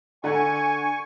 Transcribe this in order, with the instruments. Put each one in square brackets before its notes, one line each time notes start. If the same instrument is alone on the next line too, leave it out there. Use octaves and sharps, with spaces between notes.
[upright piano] D3 F#5 [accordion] G#5 C#6